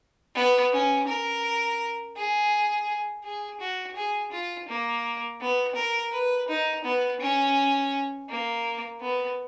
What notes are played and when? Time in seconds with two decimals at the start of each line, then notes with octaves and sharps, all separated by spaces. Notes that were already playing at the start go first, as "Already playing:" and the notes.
0.35 B3
0.72 C#4
1.08 A#4
2.16 G#4
3.24 G#4
3.60 F#4
3.96 G#4
4.32 F4
4.68 A#3
5.41 B3
5.76 A#4
6.13 B4
6.48 D#4
6.85 B3
7.20 C#4
8.29 A#3
9.01 B3